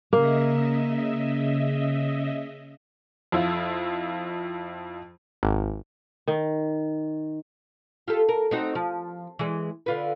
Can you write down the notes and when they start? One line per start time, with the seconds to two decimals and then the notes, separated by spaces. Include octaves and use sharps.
0.13 C#3 A#3 D#5 E5
3.32 F2 E4 F4
5.43 G#1
6.28 D#3
8.08 F4 G4 A4
8.29 A#4
8.51 C4 D#4 F#4
8.75 F3
9.39 E3 G#3
9.86 D3 F4 B4